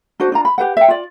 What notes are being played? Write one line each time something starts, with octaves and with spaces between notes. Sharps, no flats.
D4 F#4 C5
D4 F4 A#5
B5
G4 B4 F#5
E5 G5
F4 D5